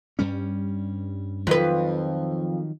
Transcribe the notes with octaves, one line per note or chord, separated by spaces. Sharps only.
G2 G3 C#4
F2 D#3 F3 F#3 B4